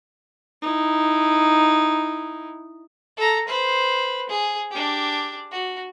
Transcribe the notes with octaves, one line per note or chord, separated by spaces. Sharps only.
D#4 E4
A4 A#5
B4 C5
G#4
D4 G4
F#4